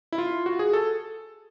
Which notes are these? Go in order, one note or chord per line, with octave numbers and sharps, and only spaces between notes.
E4
F4
F#4
G#4
A4